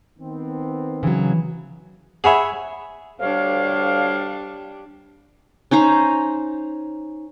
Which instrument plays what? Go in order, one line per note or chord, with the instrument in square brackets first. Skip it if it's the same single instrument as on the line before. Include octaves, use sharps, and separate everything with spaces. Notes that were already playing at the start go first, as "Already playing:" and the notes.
[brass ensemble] D#3 B3 C4
[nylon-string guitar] C#3 F#3 [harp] E3
[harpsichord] G#4 C#5 E5 [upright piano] F#5 G#5 B5
[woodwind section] D2 C#5 F5 [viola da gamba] G3 D4
[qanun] C#4 D#4 C5 A#5